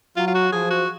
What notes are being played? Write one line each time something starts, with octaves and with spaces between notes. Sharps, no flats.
F#3 F4
F4
F#4
F3 G#4
F#4